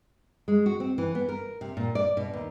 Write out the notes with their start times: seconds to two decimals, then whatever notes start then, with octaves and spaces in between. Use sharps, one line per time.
0.48 G#3
0.66 F#4
0.80 C4
0.98 E3
1.15 B3
1.29 A#4
1.61 C3
1.77 A#2
1.95 D5
2.17 B2
2.33 D#2